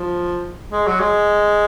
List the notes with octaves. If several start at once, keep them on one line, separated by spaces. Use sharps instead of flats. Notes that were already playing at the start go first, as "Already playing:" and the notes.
Already playing: F3
G#3
F#3
G#3